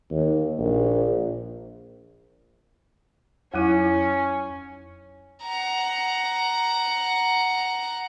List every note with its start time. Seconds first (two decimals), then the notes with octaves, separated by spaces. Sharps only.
0.11 D#2
0.58 A#1
3.54 F2 F#3 C#4 E4
5.43 F#5 A#5